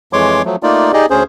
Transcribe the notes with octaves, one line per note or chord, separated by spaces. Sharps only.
F2 E3 G#3 C#5 C6 D6
F3 F#3 A3
A3 A#3 D#4 F4 D5
D#4 G4 G#4 D5 D#5
D2 C#4 G#4 C5